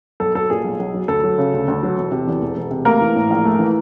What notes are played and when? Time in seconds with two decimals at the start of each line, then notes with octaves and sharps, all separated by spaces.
0.20 B1 A4
0.35 F#3 A4
0.50 A#2 G#4
0.64 B1
0.80 B1
0.94 F#3
1.08 D2 A4
1.24 F#3
1.38 C#3
1.54 D2
1.68 D2
1.83 F#3
1.98 E1
2.12 C3
2.27 E2
2.41 E1
2.57 E1
2.71 C3
2.85 A3 A#3 A#4
3.01 E3
3.16 A2
3.30 A#1
3.45 A3
3.59 E3